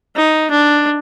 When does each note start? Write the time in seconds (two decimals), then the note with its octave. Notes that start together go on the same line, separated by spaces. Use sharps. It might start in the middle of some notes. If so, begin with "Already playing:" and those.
0.16 D#4
0.51 D4